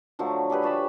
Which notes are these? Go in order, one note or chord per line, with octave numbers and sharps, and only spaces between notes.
D3 F3 F#3 A3
G3 G4 G#4 B4
F3 C#5 A5 B5